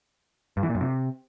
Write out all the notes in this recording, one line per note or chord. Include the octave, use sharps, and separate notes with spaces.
G2
E3
A#2
F#2
C3